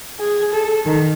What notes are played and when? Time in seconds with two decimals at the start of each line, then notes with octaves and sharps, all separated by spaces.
0.20 G#4
0.52 A4
0.85 D#3